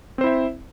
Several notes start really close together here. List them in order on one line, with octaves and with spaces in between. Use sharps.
C4 C5 E4 E5